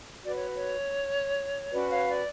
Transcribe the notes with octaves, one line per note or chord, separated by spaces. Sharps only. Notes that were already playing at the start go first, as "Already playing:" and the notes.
F#4 B4 D5
C#5
C#5
C#4 F#4 B4 D5
C#5 F5
D5